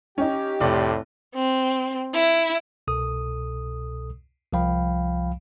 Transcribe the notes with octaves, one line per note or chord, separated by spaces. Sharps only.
C#4 D#4 G4
F1 A2 D5 C6
C4
E4
C2 B2 A4 D#6
C2 F3 F5 G5 B5